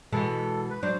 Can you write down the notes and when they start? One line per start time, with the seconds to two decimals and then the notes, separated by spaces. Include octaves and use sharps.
0.13 B2 E3 G#3 A4
0.70 B4
0.83 F#3 D4 C5